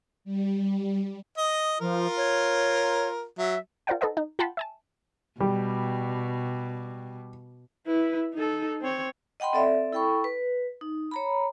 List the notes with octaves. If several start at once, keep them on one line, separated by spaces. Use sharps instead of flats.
G3
D#5
F3 F4 A#4
C#5
F#3 E5
F4 A#4 C5 D5 F#5 G5
D#4 A4 B4 C5 D#5 F#5
D#4
F4 F#5 G5 A5 B5 C6
E5 G#5 A5
B2 G3
E4 B4
D#4 A4
C4 C#5
D#5 F#5 G5 B5 C6
C4 A4 D5 E5
E4 A4 G5 B5 C#6
B4
D#4
C#5 A#5 B5